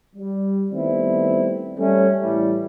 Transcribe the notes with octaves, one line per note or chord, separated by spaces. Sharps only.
G3
D#3 G3 A3 B3 C4 E4
G3 A3 C#4
A2 E3 G3